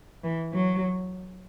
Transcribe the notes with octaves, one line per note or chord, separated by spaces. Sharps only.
E3
F#3